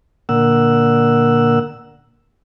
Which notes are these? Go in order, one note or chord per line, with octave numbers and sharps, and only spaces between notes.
A#2 D3 A#3 F#5 E6